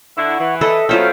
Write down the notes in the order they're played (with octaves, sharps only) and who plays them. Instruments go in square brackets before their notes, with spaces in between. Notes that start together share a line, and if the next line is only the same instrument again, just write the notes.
[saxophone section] D3 E4 [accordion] F#5 C#6
[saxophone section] E3
[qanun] A4 B4 D#5 [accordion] E5
[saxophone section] B2 A3 C#4 [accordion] F#3 F6 [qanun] F4 C5 G5